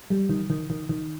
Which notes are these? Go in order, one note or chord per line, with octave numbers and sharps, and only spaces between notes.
G3
D#3
D#3
D#3
D#3